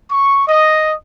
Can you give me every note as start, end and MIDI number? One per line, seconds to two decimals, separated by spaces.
0.11 0.43 85
0.48 0.93 75